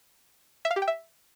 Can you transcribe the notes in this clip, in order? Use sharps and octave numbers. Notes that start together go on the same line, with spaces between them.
E5
F5
G4
G5
E5